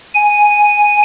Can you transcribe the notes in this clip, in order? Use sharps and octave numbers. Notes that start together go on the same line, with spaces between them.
G#5